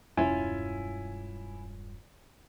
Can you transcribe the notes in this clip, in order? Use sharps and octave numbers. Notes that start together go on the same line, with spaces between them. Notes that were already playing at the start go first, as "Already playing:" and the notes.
E1 G2 C#4 E4 F4 G#5